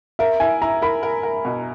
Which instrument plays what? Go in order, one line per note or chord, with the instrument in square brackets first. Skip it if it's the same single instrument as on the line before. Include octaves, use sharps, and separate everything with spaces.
[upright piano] A#4 [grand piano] E5
[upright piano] E4 [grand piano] G#5
[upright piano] E4 [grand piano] A#5
[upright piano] A#4 [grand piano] B5
[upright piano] A#4
A#4
B2